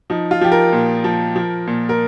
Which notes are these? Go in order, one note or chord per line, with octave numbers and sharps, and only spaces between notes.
F3 D#4
F4
F3 G4
A#4
A#2
F3
F3
A#2
A#4